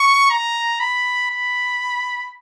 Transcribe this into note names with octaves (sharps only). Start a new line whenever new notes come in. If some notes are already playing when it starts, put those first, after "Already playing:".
Already playing: C#6
A#5
B5
B5